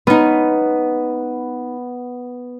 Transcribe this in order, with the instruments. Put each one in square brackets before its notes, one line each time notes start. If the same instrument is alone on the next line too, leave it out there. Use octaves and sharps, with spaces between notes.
[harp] B3 [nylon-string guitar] C#4 D#4